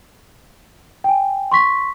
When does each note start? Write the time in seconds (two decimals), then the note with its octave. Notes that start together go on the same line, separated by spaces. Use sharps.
1.04 G5 G#5
1.52 C6 C#6 B6